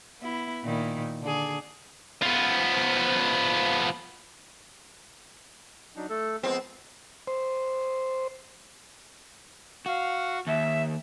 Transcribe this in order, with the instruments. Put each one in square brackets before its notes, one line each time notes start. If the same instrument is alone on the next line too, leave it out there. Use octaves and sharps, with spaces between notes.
[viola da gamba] B3 E4
A#2 D#3 E4
D3 G#4
[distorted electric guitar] F3 B3
[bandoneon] F#3 D4 D#4
A3 A4
[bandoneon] F3 G#3 B3 [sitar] C4
[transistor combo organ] C5
[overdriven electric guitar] F#4 [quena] F5
[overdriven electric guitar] D#2 [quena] E5